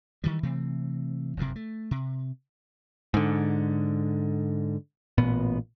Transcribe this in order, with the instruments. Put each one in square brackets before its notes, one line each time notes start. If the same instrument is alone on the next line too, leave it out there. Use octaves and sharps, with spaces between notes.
[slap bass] D#3 E3 G3
C3 E3 A3 C4
F#1 F2 A2 C3
A3
C3
[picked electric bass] G#2 D3
A1 A#2 B3